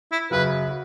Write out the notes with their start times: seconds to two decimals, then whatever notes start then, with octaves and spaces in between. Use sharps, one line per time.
0.12 E4
0.31 F#2 C#3 F#3 B4
0.69 F#4